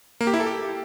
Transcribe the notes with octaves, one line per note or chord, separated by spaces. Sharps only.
A#3
G4
E4
A4
G4